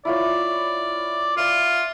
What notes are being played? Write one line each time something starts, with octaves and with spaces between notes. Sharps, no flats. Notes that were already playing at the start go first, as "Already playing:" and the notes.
E4 F4 C#5 D5
F4 D5 E5